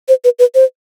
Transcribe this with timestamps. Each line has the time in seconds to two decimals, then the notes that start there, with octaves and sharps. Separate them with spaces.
0.08 C5
0.24 B4
0.39 B4
0.55 C5